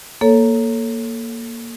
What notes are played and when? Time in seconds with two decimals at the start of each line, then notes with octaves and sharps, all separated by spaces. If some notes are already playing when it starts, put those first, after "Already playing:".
0.21 A#3 A4 C#5